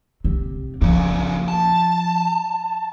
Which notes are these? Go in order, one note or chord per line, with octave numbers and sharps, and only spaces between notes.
C3
A#2 C#3 F3
A5